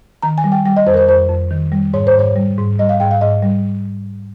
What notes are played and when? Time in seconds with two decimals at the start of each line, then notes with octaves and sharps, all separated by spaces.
0.23 D#3 A#5
0.38 G#5
0.44 G3
0.52 G5
0.65 G3 G5
0.77 D#5
0.86 F2 C5
0.94 A#4
0.97 C5
1.08 F2 C5
1.29 F2
1.51 D#3
1.72 G3
1.94 G#2 C#5
2.07 C5
2.14 G#2 C#5
2.36 G3
2.58 G#2
2.79 G3 D#5
2.89 F5
3.00 G#2 G5
3.11 F5
3.21 G#2 D#5
3.42 G3